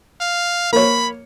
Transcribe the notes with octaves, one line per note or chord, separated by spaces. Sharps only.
F5
A#3 C#5 B5